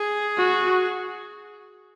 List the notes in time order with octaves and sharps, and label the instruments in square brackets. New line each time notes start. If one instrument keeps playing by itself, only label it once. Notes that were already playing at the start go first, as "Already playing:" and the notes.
Already playing: [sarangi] G#4
[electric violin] F#4